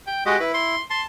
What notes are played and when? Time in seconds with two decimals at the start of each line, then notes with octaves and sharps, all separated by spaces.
0.07 G5
0.26 G#3 F#4 G4 D#5
0.40 E4 B4
0.54 C6
0.90 A5 C6